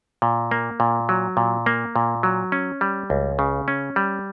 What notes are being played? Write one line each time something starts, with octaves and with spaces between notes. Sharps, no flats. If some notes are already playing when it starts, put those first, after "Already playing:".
A#2
A#3
A#2
F#3
A#2
A#3
A#2
F#3
C#4
G3
C#2
C#3
C#4
G3